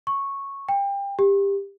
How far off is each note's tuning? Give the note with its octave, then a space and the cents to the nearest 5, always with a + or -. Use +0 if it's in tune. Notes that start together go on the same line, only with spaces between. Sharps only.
C#6 -10
G5 +25
G4 +20